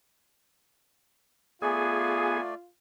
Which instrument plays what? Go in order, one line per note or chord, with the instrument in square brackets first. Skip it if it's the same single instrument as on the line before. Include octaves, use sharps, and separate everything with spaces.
[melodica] A3 D5 [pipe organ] B3 G#5 [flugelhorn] F4 [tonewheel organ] G#4